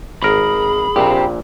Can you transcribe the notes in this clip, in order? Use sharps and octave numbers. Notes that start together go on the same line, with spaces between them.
G#1 G#4 A#4 B5
A#1 A#2 C4 G4